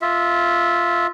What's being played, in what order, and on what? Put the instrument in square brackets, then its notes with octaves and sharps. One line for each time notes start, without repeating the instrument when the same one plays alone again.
[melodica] F4 E5